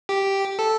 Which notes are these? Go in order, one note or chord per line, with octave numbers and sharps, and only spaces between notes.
G4
A4